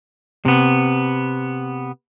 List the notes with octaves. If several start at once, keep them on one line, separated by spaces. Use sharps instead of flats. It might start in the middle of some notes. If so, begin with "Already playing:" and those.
C3 B3